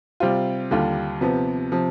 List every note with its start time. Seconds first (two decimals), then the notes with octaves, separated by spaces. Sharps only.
0.20 C3 G3 C4 F4
0.71 D#2 D3 G3 D4 F4
1.21 C3 F3 B3
1.72 C3 F3